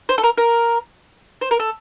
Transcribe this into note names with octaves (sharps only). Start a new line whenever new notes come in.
C5
A4
A#4
A#4
C5
A#4
A4